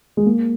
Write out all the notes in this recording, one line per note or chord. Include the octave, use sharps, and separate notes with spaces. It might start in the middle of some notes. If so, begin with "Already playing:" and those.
G#3
A#3